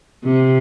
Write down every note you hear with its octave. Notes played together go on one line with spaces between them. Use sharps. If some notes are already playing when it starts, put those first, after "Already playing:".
C3